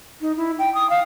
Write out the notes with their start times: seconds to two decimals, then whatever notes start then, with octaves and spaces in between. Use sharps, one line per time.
0.21 D#4
0.37 E4
0.59 G5
0.75 D#6
0.90 F5